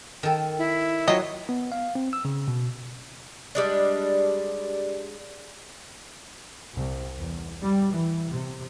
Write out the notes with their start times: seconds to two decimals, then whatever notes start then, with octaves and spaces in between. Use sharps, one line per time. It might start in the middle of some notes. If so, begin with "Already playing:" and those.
0.23 D#3 A4
0.58 E4
1.08 F#3 F4 F#4 D#5
1.49 B3
1.72 F5
1.95 C4
2.13 E6
2.25 C#3
2.48 B2
3.55 G3 G#3 D4
6.75 C2
7.17 E2
7.60 G3
7.92 E3
8.30 C3